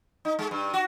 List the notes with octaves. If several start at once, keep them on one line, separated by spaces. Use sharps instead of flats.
D#4
G#3
G2
F#4